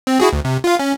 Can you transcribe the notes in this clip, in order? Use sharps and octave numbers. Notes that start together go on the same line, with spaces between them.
C4
E4 F#4 G#4
D2
C3
F4 F5
C#4